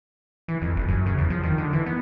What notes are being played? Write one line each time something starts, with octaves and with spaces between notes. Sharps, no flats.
E3
F2
F#1
F#2
C#3
E2
F3
D#3
D3
E3
B3